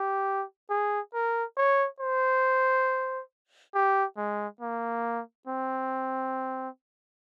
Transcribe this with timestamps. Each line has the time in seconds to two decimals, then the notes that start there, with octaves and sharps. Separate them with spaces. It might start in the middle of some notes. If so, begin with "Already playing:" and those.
Already playing: G4
0.70 G#4
1.14 A#4
1.57 C#5
2.00 C5
3.75 G4
4.17 G#3
4.61 A#3
5.47 C4